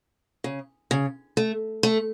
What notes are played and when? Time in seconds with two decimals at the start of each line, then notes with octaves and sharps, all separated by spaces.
0.44 C#3
0.91 C#3
1.37 A3
1.83 A3